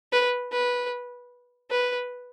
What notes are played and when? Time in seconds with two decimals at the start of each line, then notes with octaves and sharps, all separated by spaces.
0.12 B4
0.52 B4
1.70 B4